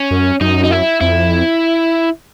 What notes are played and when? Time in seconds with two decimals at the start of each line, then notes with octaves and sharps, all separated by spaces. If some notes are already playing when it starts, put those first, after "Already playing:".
Already playing: C#4
0.11 F#2
0.41 F#2 D#4
0.64 D#4
0.71 E4
1.01 F2 E4